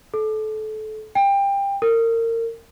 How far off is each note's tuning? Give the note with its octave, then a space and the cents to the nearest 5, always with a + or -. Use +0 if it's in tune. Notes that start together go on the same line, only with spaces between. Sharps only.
A4 -25
G5 +25
A#4 -30